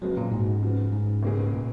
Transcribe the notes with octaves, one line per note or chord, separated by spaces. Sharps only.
F2 C#3 F#3 G#3 B3 F#4
A#2
G#2
C#3 F3 B3
G#2
C#2 B2 A#3 C#4 G#4
A#2